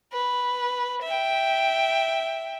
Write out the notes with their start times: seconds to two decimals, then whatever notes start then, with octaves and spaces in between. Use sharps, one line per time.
0.13 B4
1.03 E5 G5